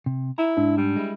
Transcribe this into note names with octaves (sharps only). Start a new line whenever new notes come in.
C3
E4 A#5
G#2 D4
G3
G#3 E4